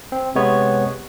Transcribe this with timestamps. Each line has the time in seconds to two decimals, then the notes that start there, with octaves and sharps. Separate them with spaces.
0.12 C4
0.35 C3 G#3 B3 C#5